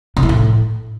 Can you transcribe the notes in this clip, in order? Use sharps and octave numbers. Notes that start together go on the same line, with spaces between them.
D3
E3
A2